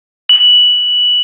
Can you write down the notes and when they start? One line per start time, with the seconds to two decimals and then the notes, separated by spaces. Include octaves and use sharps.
0.29 F#7